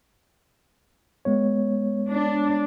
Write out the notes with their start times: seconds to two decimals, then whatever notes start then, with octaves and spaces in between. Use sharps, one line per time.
1.25 G#3 B3 C#5
2.08 D4